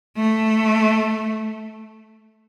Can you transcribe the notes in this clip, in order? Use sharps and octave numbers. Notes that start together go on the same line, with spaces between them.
A3